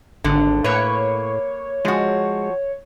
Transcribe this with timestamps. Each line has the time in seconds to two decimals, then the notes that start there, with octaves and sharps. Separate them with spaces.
0.24 G#1 D3
0.64 A2 A#3 B4 C#5
1.85 F3 G#3 F#4